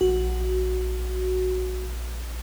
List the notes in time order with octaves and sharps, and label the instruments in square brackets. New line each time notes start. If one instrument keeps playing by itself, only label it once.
[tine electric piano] A#1 [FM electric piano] F#4